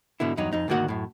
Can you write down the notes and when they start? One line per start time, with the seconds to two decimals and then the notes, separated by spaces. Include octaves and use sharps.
0.20 G#2 B2 D3 E4
0.37 E2 G2 F#3 D#4
0.53 F2 D#4
0.68 D2 G#2 D#3 A#3 F#4 F#5
0.88 F#2 A2